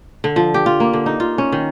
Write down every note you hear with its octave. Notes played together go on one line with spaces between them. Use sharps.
D3
F3
G4
F4
A#3
D3
D#4
F4
C#4
D#3